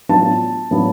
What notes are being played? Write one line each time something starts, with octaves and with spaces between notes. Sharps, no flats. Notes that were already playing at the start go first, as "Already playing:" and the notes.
A2 F#3 B3 D4 F4 A5
A2 F#3 B3 D4 F4